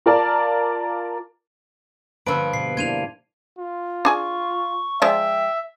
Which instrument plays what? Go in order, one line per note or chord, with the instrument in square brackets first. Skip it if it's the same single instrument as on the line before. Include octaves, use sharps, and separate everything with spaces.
[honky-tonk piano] F4 A#4 D5 A5
[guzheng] G2 F3 [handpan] D3 A#3 [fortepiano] B4 E6 [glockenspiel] D7
[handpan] B2 [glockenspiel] C7
[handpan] A#3 D4 E4 [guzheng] C6 [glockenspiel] G#6 D#7 F7
[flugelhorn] F4
[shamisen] D4 G#4 G#5 [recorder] C#6
[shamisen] F3 G#3 D5 [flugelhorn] E5 [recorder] G5